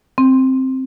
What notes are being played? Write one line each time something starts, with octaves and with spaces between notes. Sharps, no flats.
C4